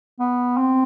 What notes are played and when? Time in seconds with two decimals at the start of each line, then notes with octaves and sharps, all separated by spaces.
0.20 B3
0.57 C4